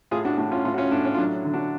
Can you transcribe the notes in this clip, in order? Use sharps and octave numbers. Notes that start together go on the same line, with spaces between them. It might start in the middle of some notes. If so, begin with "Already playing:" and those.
A2 F4 G#4
D4 F#4
A2 D4 F#4
C#4 F4
A2 C#4 F4
F#4
C#4 F4
A2 D4
C#4
F4
F#3 D4
D3
D4 F#4